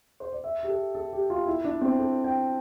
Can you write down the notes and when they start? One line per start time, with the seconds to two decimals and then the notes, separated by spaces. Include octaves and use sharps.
0.20 C5
0.33 D5
0.44 E5
0.63 G4
0.69 A4
0.95 A4
1.13 G4
1.30 F4
1.46 E4
1.64 D4
1.81 C4
1.99 A4
2.24 G5